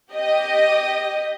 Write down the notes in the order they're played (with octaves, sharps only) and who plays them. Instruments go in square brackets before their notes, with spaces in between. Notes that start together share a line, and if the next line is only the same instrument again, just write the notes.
[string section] G4 D#5